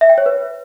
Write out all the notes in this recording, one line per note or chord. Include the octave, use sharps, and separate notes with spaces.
E5
G5
C#5
B4